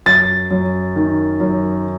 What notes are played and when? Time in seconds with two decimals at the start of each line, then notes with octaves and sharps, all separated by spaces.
0.06 F#2 A6
0.51 F#2
0.96 D#3
1.40 F#2